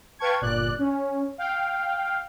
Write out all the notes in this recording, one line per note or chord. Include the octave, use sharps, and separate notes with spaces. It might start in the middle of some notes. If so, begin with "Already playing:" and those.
B4 F5 G5 A5 C#6 G#6
G1 A#2 D5 F#6
C#4
F5 G5